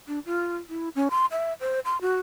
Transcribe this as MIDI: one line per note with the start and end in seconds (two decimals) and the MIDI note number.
0.08 0.19 62
0.26 0.56 65
0.70 0.89 64
0.95 1.08 61
1.11 1.26 84
1.32 1.53 76
1.61 1.80 72
1.85 2.00 84
2.01 2.20 66